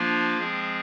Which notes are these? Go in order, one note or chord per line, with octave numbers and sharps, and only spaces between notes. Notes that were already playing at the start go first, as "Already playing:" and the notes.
Already playing: F3 A#3 D4 F4
F3 G#3 C4 G#4